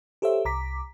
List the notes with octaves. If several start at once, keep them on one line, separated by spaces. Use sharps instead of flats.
G4 A4 C5 C#5 E5
C2 A#5 D6 B6